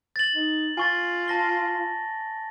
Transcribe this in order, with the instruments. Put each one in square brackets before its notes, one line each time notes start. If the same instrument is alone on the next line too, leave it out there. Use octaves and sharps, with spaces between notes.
[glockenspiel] A6 F#7
[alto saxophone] D#4
[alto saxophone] F4 [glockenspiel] G#5 C#6 A6
[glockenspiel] A5 A#6 G7